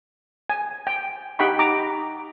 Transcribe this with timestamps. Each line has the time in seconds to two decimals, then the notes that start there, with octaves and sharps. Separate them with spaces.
0.50 G#5
0.87 G5
1.39 D#4 G4 F#5 G5 B5 C#6
1.59 A#5 D6